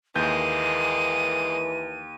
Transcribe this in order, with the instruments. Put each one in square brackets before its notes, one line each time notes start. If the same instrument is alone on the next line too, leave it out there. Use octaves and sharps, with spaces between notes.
[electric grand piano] D#2 G6 [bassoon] E3 [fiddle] G#3 A#3 [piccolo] D#7